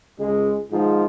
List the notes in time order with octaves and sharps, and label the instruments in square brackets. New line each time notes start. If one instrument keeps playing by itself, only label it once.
[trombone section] C#2 G#3
G#2 D#3 F3 F4